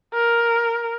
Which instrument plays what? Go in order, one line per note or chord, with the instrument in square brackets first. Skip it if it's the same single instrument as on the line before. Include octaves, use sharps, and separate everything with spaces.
[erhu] A#4